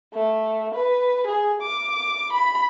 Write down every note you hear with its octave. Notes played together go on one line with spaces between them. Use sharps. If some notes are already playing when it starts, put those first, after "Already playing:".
A3
B4
G#4
D6
B5